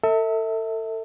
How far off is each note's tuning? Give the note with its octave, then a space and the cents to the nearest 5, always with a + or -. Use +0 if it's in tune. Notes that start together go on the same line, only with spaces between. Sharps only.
A4 +35 E5 -30